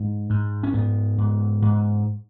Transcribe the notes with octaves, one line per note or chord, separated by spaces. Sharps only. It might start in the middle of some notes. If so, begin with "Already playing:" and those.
Already playing: G#2
G#2
C#4
G#2 B3
G#2
G#2